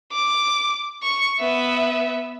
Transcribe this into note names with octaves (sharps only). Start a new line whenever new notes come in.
D6
C#6
B3 E5